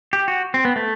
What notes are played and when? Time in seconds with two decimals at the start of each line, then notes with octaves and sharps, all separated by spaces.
0.13 G4
0.28 F#4
0.54 C4
0.65 B3
0.76 A3